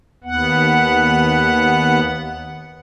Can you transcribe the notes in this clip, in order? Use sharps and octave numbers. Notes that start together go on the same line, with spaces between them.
D#2 B3 F#5